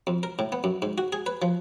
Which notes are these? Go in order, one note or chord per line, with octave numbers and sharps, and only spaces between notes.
F2
A#4
A2
B3
F#2
G#2
F#4
G#4
B4
F3